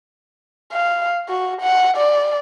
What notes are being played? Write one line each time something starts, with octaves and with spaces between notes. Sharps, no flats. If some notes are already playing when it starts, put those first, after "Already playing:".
F5
F#4
F#5
D5